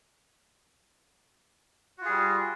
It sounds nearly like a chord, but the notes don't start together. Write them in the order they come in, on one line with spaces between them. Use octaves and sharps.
F#4 F4 G#4 G3